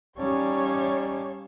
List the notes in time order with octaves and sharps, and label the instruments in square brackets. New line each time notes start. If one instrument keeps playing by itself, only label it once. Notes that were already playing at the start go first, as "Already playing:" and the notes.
[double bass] G3 C#4 [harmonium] D#4 D5 A5 [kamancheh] C#5 F5